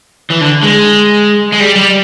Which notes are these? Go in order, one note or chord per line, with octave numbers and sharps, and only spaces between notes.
E3
D3
G#3
G#3
G3
G3